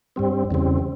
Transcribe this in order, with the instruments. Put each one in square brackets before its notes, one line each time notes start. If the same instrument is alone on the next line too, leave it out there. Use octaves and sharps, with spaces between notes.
[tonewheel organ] G2 G3 C4
E2 C#3 G3 C4